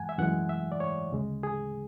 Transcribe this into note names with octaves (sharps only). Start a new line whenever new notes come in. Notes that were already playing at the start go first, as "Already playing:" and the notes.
Already playing: F#2 E3 G#3 F#5 G#5
E5
F#2 E3 G#3 F#5
E5
D5
C#5
D2 C#3 G#3
G#4